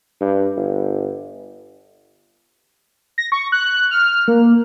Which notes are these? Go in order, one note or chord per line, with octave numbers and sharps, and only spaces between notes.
G2
G1
A#6
C#6
F#6
F6
A#3